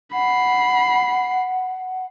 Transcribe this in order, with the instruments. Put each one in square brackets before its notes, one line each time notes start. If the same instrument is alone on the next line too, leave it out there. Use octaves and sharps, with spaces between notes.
[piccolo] F#5 [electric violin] B5 C7